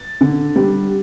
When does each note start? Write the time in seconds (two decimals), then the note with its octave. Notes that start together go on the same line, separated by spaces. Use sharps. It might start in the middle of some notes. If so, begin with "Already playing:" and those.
Already playing: A6
0.21 D3
0.56 G3